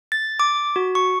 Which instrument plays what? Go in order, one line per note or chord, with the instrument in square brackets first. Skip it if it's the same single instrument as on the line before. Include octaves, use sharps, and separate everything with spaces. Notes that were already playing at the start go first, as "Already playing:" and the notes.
[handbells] A6
D6
F#4
C#6